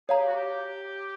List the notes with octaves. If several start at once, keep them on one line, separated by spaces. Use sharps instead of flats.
G#4 C#5 F5 A#5
G4
F#4
G4